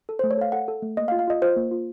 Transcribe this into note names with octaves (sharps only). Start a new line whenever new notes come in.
A4
A3 C5
C#5
A4 F5
A4 F#5
A4
A3
A#3 D#5
F5
F4
F5
F4 D#5
F4 C5
A#3
F4